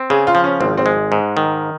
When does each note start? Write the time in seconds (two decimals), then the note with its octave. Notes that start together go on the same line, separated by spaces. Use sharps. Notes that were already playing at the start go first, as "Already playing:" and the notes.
Already playing: C4
0.10 C#3 G#4
0.27 F4
0.35 F3
0.44 C#4
0.60 G#1 C4
0.77 C4
0.86 G#3
1.12 G#2
1.37 D#3